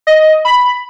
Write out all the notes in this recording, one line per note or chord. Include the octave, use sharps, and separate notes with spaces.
D#5
B5